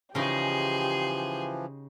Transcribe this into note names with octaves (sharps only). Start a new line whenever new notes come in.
C#3 E3 F3 D#4 G4 G#4 C6